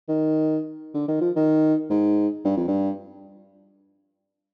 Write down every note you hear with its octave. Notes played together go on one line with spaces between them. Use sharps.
D#3
D3
D#3
F3
D#3
G#2
G2
F2
G2